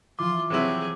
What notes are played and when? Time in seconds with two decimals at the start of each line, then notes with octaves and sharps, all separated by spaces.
0.19 E3 F3 F4 C6 D6
0.50 C3 F#3 C4 E4 G#4